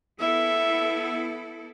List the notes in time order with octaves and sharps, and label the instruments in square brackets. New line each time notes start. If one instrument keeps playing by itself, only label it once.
[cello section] B3 E4 A4 [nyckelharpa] E5